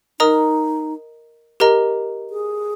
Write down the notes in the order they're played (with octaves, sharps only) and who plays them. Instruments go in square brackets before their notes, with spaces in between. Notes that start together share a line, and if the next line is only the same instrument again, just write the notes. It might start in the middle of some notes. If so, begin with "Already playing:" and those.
[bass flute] D#4 [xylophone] A#4 D#5 A#5 D#6
[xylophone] G4 A#4 D#5 A#5
[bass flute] G#4